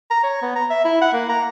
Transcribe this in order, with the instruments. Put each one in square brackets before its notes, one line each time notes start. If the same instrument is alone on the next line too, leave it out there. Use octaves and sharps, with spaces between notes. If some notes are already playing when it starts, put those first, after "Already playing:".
[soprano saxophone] A#5
C#5
B3
A#5
E5
E4
F#5
A#3
A#5